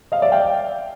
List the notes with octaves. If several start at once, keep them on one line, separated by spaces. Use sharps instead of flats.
D#5 F5
D5 E5
F5 G5